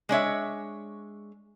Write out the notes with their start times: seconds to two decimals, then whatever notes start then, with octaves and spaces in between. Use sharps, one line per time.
0.09 G#3 D4 C#5 E5